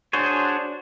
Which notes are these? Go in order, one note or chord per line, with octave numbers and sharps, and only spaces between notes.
D4 F#4 G#4 C5 C#5